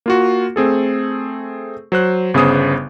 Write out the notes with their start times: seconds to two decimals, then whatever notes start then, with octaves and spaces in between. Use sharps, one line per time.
0.06 A#3 F4 F#4
0.56 A3 C4 G#4 A4
1.92 F#3 C5 F#6
2.34 G1 C#3 B3 G#4 C5 D#6